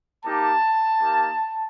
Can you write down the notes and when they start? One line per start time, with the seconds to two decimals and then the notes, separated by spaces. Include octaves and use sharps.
0.24 A#3 D#4 G4 A5
1.01 A#3 D#4 G4